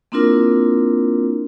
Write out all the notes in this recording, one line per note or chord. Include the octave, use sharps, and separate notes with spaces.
A#3 C4 D4 E4 F4 A#4